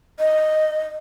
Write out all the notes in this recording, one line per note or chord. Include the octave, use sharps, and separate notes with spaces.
D#5